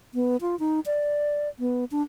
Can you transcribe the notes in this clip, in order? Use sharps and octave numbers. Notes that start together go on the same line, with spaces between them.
B3
F4
D#4
D5
B3
D4